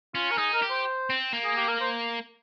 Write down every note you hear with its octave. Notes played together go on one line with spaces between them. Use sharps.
C#4 F4
A#4
D#4 G#4
A#4
G4
C5
C4
A#3
G#4
G4
A#4
C5